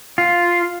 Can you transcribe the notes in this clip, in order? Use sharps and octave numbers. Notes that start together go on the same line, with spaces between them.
F4